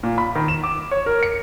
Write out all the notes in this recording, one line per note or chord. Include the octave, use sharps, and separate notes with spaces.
A#2
B5
D#3
E7
D6
C#5
A#4
C#7